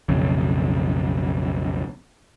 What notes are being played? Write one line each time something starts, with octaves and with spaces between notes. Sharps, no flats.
B1 F2 C#3